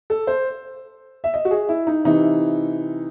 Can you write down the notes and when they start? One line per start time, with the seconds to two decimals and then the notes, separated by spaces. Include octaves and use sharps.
0.10 A4
0.27 C5
1.24 E5
1.34 D#5
1.45 F#4
1.51 G#4
1.69 E4
1.87 D#4
2.04 C3 E3 D#4